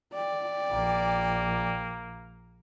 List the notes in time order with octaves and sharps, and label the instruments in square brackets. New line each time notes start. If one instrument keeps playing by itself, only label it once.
[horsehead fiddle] D5 [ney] G5
[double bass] A#1 [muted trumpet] A#3